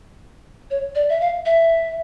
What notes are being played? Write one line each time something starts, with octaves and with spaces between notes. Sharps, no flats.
C#5
D5
E5
F5
E5